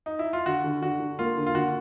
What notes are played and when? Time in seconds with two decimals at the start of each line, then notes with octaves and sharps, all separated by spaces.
0.06 D#4
0.19 E4
0.33 F4
0.46 D3 F#4
0.64 D3
0.82 D3 F#4
1.00 D3
1.19 A#3 F4
1.37 D3
1.47 F4
1.55 D3 F#4